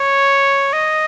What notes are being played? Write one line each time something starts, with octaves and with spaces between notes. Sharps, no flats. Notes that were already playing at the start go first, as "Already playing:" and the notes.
Already playing: C#5
D#5